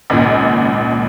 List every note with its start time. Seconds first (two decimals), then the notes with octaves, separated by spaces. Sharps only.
0.10 G#1 C#2 A#2